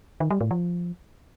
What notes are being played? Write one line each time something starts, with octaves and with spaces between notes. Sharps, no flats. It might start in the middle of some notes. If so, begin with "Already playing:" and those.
D#3
G3
A2
F3